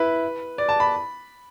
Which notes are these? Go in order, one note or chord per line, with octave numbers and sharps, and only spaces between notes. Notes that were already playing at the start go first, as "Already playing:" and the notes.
Already playing: E4 B4
D5
A5
B5